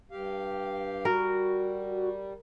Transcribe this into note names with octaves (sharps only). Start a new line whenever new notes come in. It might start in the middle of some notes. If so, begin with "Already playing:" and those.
G2 G4 F5
G3 F#4 A#4